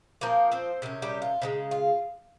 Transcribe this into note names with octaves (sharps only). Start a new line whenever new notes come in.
F3 A#3 C4 A#4
C4 C5
C3 D#3 C#4
G3 G4
F4
C#3 F3 G#3 D#4
F4